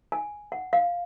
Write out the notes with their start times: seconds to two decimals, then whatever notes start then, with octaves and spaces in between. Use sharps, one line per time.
0.12 G#5
0.52 F#5
0.73 F5